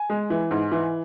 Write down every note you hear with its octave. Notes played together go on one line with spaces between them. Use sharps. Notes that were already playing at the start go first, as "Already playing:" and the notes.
Already playing: G#5
G#3
E3
G#2
E3